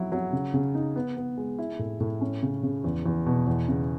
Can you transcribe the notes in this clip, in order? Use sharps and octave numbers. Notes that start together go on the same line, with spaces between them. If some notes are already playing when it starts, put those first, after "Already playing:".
Already playing: F#3 E4
F#3
C#3
C#3
D#4
B3
B3
G#3
E4
A2
A2
C#4
C#3
C#3
E2
E2
B2
E2
C#3